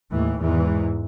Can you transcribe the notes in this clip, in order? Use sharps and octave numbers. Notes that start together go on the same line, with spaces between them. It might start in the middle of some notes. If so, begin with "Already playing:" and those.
D#2 A2 E3
E2 G#2 E3